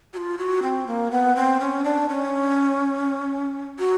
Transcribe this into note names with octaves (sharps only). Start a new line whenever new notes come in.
F#4
F4
F#4
C4
A#3
B3
C4
C#4
D4
C#4
F#4